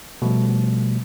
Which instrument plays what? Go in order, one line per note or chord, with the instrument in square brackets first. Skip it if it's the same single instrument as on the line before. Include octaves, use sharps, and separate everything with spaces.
[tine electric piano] B2 F3 G3 A3